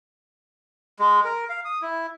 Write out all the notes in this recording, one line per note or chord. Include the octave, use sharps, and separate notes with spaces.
G#3
A#4
F5
D#6
E4